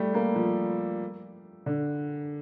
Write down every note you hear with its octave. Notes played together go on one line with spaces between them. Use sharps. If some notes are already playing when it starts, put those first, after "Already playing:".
Already playing: G3 A3
A#3
F3
D3